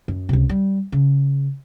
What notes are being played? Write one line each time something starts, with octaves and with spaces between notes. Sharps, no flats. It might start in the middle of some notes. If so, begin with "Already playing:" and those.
F#2
C#2 C3
G3
C#3